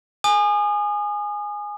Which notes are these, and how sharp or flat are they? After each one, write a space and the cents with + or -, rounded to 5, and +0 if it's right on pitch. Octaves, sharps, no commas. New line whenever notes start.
G#5 +0 D#6 -35